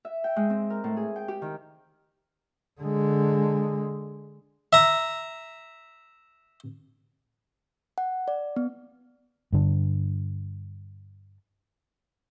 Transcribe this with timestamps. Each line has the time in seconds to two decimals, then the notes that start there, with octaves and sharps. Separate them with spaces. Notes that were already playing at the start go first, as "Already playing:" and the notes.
0.05 E5
0.24 G5
0.36 G#3
0.50 C4
0.70 A#4
0.84 A2
0.97 G#4
1.16 G5
1.28 G4
1.42 D#3
2.81 D3 G#3
4.73 E5 A#5
7.98 F#5
8.28 D5
8.56 B3
9.52 G2 D3